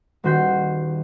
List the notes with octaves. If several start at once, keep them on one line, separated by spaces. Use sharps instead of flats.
D#1 D#3 F#4 C6 G6 B6